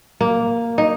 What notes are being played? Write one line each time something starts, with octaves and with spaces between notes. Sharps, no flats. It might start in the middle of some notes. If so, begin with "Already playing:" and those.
A#3
D#4